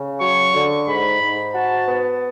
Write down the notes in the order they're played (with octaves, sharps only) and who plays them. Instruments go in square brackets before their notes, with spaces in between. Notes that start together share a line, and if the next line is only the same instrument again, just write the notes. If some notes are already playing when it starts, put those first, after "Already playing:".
Already playing: [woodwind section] C#3
[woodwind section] F#3 [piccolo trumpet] C#6
[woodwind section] D3
[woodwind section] G#2 [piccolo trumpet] B5
[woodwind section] G#2
[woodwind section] F#4 [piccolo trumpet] A5
[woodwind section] B3